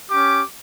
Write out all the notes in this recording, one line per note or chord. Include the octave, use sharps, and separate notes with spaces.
C#4 G4 D6